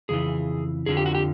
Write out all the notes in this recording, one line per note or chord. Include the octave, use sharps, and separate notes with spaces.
F2 C#3 E3 G#4
F2 D3 F3 G#4
G4
F#4
G4